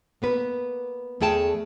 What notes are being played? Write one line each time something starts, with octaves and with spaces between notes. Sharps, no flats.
A#3 B3 B4
E2 A3 G#4 G5 A5